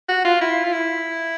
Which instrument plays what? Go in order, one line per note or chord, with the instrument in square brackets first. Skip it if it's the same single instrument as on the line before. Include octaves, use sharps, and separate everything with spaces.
[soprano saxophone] F#4
F4
E4
F4
E4